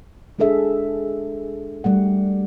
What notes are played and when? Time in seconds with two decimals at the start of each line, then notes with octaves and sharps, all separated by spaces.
0.39 G#3 D4 G#4 A4 E5
1.84 G3 A3 F#5